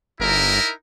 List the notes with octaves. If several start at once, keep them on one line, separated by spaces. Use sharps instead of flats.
G1 D#4 E4 A#4